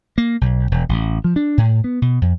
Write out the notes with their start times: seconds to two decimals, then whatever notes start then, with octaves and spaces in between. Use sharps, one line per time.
0.18 A#3
0.41 B1
0.71 E1
0.89 A1
1.24 F3
1.36 D4
1.58 A2
1.84 B3
2.02 B2
2.22 F2